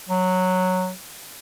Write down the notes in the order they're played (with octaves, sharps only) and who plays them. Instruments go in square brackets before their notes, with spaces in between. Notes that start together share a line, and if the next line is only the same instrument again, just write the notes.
[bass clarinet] F#3